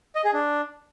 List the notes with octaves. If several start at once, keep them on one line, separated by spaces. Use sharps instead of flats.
D#5
G#4
D4